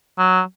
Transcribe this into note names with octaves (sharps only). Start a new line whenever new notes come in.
F#3